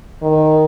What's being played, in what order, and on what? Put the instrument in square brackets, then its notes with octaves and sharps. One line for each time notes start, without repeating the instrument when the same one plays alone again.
[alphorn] D#3